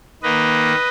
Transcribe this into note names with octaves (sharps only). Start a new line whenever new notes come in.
D#3 A#3 B4 D#5